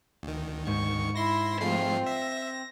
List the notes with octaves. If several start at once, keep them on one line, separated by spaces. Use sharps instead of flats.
D2 D#3
G#2 C#6
E4 C6 A#6
F3 G#3 A3 C4 F4 C7
E5 A#6